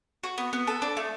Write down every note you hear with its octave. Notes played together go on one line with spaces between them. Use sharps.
F#4
B3
B3
A4
D4
A3